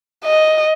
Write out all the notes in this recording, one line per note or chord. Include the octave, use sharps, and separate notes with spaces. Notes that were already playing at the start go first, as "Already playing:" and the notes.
D#5